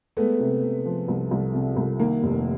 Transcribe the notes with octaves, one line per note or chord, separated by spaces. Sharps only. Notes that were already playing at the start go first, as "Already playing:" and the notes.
G#3 A3 B3
C3
C3
F3
C2
C2
C3
C2
D#3 A#3
F1